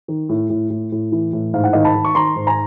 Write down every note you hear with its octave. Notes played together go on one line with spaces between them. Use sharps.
D#3
A2
A2
A2
A2
E3
A2
G#2 F5
F#5
D#3 D#5 F5
A5 B5
D#3
C#6
D#3 A#5 C6
G#2
G#5 A#5